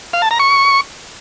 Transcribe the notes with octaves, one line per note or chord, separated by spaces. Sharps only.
F5
A5
A#5
C#6